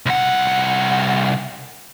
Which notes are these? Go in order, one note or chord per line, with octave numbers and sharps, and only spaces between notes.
C2 F#5